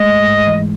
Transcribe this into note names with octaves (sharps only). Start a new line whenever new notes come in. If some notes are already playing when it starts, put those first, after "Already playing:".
Already playing: G#3 A3 D#5
G#2
G#2
E3